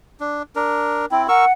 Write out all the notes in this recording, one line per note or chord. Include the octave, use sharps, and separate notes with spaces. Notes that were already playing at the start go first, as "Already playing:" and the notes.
D4
D4 A#4
C4 E4 G5
A#4 F#5 C#6 E6